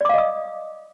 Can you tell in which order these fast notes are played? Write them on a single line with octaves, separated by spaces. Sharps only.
D5 D6 F5 D#5 D#6